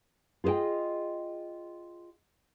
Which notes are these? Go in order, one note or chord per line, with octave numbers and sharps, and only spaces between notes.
F4 G#4 B4 D#5 G5